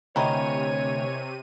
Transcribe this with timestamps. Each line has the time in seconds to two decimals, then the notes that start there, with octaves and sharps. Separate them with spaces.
0.16 D2 C3 D#3 E3 C#5 D#7